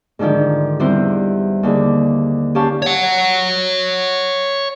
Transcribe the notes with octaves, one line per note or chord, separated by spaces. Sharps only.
G#2 D3 D#3 F3 D4
E2 G3 C4 E4 C5
D#2 D3 G#4
C#4 G4 C#5 F5 A5
C#5 F#5